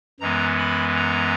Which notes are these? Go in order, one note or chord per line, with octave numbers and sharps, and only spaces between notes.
F#2 E3 G#3 B3 A#5
B5
A#5